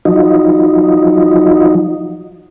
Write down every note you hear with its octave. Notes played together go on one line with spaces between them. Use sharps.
F3 F#3 D#4